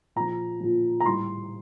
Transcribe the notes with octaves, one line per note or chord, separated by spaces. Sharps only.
A#2 F3 A#5
A#2 F3
A#5
A2 G3 C6